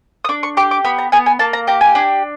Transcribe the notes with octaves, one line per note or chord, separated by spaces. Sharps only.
D#6
D4 D6
C#6
G4 D6
D6
B3 B5
A#5
B3 G#5
G#5
A#3 A5
A#5
G4 A#5
G#5
D4